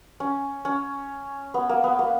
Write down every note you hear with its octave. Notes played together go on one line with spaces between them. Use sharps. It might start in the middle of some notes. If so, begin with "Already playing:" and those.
C#4
C#4
B3
A#3
B3
A#3